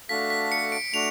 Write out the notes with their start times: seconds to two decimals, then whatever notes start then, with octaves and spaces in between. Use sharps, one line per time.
0.09 A3 D4 F#4 A4 F5 B6
0.30 B6
0.52 C#7
0.72 D7
0.94 A3 D4 F#4 F7